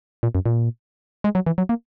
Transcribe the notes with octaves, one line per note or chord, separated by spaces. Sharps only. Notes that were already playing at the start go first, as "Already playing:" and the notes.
A#2
F#2
A#2
G#3
F#3
E3
F#3
A#3